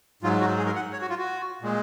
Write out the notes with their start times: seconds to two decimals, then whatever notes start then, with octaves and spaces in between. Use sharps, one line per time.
0.22 G#2 F#3 F4
0.40 F#4
0.58 G#4
0.66 A#4
0.75 F#5
0.93 C#5
1.02 F#4
1.10 F4
1.18 F#4
1.62 A#2 G#3